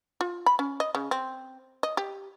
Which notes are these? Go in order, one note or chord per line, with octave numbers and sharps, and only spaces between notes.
F4
B5
C#4
D#5
C#3
C4
D#5
G4